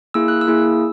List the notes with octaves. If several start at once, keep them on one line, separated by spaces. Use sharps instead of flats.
A#3 E4 G#4 E6
F#6
E6
A#3 E4 G#4